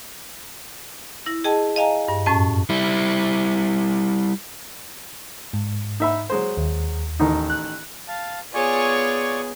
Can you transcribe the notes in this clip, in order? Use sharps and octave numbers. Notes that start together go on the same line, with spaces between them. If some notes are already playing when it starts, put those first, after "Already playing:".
E4 A#6
G#4 D#5 G5 A5
D#5 F5 G#5 A#5
G2
F#2 A2 C#4 A5
G3 E4
G#2
D#4 E5 B5
F#3 G#3 C5
D#2
A1 D#3 D#4
F#6
F5 A5
B3 F4 G#4 C#5 D5 G#5 C#6